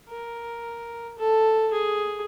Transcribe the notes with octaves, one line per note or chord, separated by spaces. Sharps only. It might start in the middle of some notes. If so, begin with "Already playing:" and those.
A#4
A4
G#4